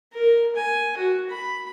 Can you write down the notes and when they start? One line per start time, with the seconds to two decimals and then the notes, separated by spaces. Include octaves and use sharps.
0.13 A#4
0.56 G#5
0.97 F#4
1.30 B5